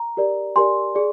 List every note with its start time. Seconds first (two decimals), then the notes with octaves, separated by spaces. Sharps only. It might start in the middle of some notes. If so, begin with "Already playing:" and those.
Already playing: A#5
0.17 G4 A#4 D5
0.56 G4 A#4 D5 G#5 C6
0.95 G#4 D5